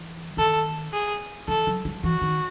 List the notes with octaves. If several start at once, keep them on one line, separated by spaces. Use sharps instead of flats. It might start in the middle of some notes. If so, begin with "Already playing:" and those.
Already playing: E3
D#3 A4
G#4
E3 A4
F#3
F#3
E3 F#4
D#3